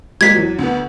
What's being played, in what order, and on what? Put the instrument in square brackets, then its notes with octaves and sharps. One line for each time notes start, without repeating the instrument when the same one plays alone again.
[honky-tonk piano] G3 G#3 A#3 [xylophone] G#6 B6
[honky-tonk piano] E2 F#3
D2 B3